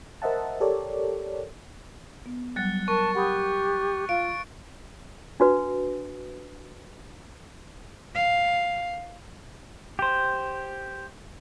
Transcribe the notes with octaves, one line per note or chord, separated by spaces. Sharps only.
A#4 C5 D#5 E5 F#5 A5
G4 A4 A#4 C#5 D5
B3
F#3 G3 F#6 A6 C#7
A#4 A5 C#6
G4 F#5 B5 D#6
F4 F5 D7
D4 F#4 B4
F5
G4 C5